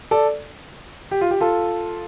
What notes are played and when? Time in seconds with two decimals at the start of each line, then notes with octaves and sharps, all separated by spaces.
0.11 A4 D5
1.11 G4
1.21 F4
1.31 G4
1.40 F4 A4